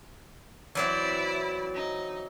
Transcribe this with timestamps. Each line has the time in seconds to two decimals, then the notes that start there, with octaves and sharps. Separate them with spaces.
0.75 E3 F#3 C4 E4 D5
1.74 D#4